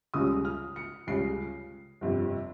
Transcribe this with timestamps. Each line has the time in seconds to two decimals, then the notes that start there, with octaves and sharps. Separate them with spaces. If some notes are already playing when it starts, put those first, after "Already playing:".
0.14 C#2 C#3 G3 D#6
0.45 F6
0.76 C#7
1.07 C#2 C#3 G3 C7
2.01 G1 F2 C3